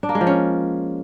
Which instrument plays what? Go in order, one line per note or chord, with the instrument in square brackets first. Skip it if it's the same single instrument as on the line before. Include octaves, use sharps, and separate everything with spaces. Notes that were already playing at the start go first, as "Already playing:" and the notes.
[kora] D4
A#3
G#3
F3
C#4